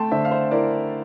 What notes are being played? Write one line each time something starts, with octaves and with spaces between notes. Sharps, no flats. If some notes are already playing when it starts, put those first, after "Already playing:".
Already playing: A3 G5 A5 C6
D3 C5 E5
F5
C5 E5
E4 A#4 D5